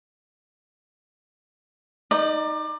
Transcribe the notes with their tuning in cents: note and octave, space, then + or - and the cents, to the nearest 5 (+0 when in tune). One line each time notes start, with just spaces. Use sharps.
D#4 +0 D5 +25 D#6 -45